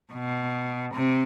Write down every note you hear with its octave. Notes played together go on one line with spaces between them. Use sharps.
B2
C3